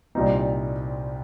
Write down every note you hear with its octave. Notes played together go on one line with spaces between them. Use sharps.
C2 A#2 G3 C4 D#4